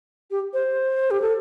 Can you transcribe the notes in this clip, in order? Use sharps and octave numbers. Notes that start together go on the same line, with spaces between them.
G4
C5
G4
A4